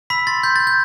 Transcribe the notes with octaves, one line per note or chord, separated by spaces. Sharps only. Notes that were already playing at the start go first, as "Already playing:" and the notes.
B5 E6 B6
C6 A6
C6 G6
G6 A6
G6